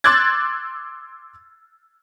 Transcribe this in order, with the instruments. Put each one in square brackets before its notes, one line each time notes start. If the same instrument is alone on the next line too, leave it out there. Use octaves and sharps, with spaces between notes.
[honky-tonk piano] C6 D6 E6 F#6 G#6 A6